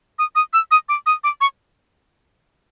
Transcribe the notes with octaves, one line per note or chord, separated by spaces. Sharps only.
D#6
D#6
E6
D#6
D6
D#6
D6
C#6